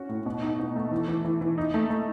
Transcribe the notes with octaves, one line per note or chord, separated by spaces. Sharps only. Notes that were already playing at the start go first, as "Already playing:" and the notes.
Already playing: C#4 F#4
A2
B2
D#4
B2
A3
E3
E3
E3
E3
D#4
A3
A3